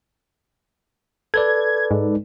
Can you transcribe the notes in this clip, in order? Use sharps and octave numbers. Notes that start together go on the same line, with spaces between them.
A4 B4 D5 G#6
G#2